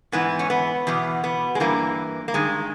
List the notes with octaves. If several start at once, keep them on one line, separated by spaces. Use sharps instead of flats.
G#2 E3 B3
C#4
B3
E2 B2
B3
G#3
G2 E3 A#3
A#3
G2 D#3 G#3